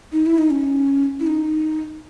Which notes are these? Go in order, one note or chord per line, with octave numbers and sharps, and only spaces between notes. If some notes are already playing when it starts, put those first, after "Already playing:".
D#4
E4
D#4
C#4
E4
D#4